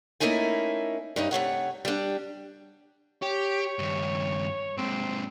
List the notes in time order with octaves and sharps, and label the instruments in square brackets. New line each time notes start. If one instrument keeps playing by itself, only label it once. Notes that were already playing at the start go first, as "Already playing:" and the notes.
[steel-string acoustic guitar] A3 A#3 C#4 D#4 E4 G#5
G2 C#4 D#4
C3 A3 C#5 F#5
G3 D4
[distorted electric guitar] G4 [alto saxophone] C#5
[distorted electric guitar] G2 D#3
[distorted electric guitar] G#2 C3 [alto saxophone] C4